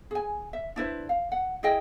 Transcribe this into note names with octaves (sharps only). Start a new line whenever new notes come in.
G#4 G#5
E5
D4 E4 B4 C5
F5
F#5
E4 G#4 D#5 G5